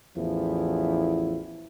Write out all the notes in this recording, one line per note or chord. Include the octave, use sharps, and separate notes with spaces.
A1 E2 F3 E4